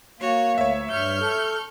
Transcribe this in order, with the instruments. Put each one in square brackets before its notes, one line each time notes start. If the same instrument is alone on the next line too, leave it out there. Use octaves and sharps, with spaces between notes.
[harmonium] A#3 [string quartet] F#4 C#5
[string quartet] D2 [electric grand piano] C#5 E5
[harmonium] G2 [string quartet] C#6 F6 G6
[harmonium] A4